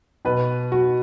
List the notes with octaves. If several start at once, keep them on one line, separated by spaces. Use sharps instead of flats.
B2 B4
F#4